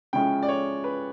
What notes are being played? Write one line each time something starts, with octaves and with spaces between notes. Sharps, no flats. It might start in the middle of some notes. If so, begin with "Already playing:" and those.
C#3 F3 G#3 C#4 E4 G5
D5
C#5
B4